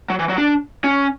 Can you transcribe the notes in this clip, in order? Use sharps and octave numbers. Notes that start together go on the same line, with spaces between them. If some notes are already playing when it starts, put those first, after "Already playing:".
F#3
E3
F#3
D4
C#4